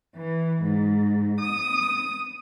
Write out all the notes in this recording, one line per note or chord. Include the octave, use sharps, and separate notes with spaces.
E3
G#2
D#6